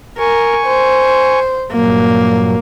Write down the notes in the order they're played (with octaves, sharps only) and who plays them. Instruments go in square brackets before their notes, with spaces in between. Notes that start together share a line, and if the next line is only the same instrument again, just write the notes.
[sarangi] A#4 [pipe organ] G#5 C#6
[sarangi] C5
[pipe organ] G2 A#2 F#3 [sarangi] A#3